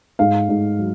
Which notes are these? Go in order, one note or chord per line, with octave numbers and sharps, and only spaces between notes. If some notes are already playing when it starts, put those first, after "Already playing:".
G#2 F5
G#2
F#3